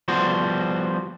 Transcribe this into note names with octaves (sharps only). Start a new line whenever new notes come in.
F3 G3 B3 F#4 C5